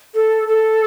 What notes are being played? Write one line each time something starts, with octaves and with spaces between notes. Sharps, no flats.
A4
A4